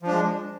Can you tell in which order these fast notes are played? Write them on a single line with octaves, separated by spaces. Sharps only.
F3 D4 G#3